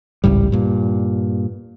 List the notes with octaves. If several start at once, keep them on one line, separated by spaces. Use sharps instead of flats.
G#1 C#2 A2 G3
G2 A#2